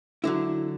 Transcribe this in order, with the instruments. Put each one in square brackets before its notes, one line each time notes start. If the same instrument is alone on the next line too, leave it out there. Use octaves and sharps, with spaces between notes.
[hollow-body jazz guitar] D3 F#3 E4